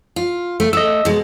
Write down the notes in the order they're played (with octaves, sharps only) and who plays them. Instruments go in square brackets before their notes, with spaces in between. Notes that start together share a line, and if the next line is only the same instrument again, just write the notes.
[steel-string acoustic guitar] F4
A3
[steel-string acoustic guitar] A3 [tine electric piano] D#5 E6
[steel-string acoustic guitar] B2 G#3